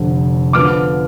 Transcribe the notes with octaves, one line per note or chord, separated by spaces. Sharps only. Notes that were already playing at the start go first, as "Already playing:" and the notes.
Already playing: F1 F2 D3
D3 F3 B3 D6 F6